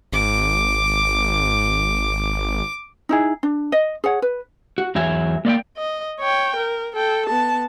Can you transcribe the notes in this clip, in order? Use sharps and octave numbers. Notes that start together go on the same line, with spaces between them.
G#1 D6
D#4 E4 G#4
D4
D#5
G#4 C#5 F#5
B4
F#4
E2 F#3 E5 G#5
A#3 D5 D#5 G5
D#5
C#5 G5
A#4
A4 G5
B3 A5